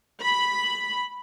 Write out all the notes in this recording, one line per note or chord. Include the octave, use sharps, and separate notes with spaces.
B5